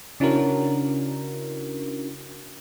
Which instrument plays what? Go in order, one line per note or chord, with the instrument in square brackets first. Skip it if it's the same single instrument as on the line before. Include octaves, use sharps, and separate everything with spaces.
[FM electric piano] C#3 C#4 D4 E4 F#4 A#4